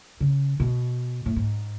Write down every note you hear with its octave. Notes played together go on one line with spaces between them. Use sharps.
C#3
B2
A2
G#2